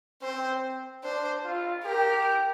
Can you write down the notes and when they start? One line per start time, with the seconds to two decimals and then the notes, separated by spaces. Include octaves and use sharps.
0.22 C4 C5
1.04 D4 C5
1.45 F4
1.85 G4 A#4